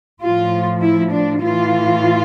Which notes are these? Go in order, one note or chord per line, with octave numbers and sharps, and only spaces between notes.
A2 F3 F4
E4
D4
A2 E3 F4